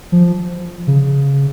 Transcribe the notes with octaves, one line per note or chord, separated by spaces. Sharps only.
F3
C#3